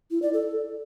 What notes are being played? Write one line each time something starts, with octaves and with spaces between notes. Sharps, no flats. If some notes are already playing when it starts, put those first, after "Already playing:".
E4
D5
A4